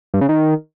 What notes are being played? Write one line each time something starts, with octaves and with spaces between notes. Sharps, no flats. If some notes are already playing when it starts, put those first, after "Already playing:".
G2
C#3
D#3